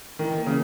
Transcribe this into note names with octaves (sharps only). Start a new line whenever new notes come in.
D#3 E3
A#3
C#3